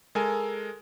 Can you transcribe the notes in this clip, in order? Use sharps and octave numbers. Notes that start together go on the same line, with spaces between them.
G#3 A4 A#4 G#5